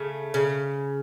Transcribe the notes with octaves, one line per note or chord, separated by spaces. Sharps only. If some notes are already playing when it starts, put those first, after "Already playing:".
Already playing: C#3 A3
C#3